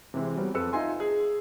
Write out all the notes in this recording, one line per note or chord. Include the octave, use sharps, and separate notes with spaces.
C3 E3 G#3 C4
F#3 G3 B3 C4
F2 A4 B4 E6 C#7
D#4 F4 E5 G#5 C6
G#4